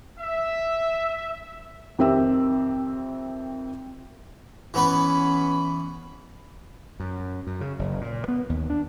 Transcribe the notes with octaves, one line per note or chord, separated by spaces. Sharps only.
E5
F2 D#3 C4 G4 E5 E6
E3 B3 C#4 B4 B5
F#2
F#2
C#3
F#1
A#2
B3
D#2
D4